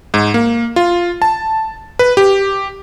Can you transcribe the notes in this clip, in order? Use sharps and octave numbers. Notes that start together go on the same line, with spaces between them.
G#2
A#3
F4
A5
B4
G4